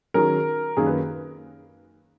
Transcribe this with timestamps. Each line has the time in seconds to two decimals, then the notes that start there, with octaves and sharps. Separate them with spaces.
0.14 D#3 F#3 C#4 G#4 A#4
0.77 F#2 D#3 A#3 G#4
0.86 B4